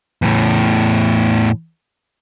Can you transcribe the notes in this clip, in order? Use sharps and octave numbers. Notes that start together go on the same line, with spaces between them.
E2 A2